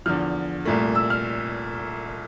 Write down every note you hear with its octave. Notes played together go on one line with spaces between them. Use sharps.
E2 D3 F3 F6
C2 A#2 A3
E6
F6